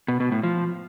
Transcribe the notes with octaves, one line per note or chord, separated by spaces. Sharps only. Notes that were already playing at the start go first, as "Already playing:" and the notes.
B2
B2
A2
F3